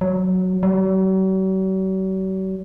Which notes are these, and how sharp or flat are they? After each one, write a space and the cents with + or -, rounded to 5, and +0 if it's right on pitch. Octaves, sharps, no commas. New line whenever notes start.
F#3 +0
F#3 +45